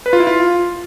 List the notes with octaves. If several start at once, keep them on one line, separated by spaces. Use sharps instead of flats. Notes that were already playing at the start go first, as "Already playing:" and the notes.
B4
F4
E4
F4